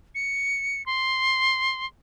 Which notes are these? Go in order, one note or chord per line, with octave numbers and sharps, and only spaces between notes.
C#7
C6